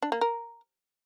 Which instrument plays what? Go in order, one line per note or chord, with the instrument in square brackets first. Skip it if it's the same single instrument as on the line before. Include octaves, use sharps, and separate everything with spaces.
[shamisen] D4
A#3
A#4